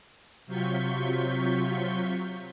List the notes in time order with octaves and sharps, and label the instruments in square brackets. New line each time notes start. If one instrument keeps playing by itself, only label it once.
[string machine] C3 F#3 F4 C#6 G6 B6